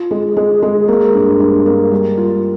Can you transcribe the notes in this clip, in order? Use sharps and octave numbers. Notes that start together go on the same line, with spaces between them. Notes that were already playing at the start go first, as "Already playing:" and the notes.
Already playing: F4
G#3
G#3
G#3
A#3
G2
G2
A#3
G3
F4